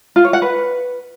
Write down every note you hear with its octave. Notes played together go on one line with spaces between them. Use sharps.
F4
C#5
F#5
B4